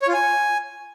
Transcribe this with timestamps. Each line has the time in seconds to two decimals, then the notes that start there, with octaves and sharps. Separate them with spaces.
0.02 C#5
0.08 F4
0.13 G#5